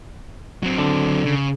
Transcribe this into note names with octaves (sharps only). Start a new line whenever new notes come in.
F#3 C4
D3
C#3